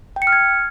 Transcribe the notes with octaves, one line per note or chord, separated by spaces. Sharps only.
G5
C#7
F6
G#6